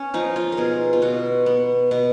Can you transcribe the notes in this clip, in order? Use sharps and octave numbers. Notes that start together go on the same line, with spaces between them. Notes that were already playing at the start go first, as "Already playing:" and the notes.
Already playing: C#4
F3 D#4
F4
A#4
B2 G#4
F4
B2 F#4
B3
B2